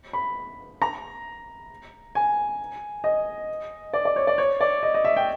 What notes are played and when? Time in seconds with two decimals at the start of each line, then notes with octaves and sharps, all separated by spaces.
0.13 B5
0.82 A#5
2.15 G#5
3.04 D#5
3.93 D5
4.05 D5
4.16 C#5
4.27 D5
4.38 C#5
4.60 D5
4.83 D#5
4.94 D#5
5.04 E5
5.16 G5